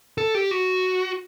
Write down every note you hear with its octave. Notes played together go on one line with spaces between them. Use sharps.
A4
G4
F#4